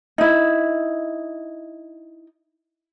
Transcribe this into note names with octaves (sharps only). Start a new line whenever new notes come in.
D#4 E4